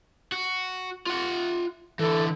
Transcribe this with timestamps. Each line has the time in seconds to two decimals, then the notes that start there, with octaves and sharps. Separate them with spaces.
0.32 F#4
1.06 F4 F#5
1.99 D3 E3 A4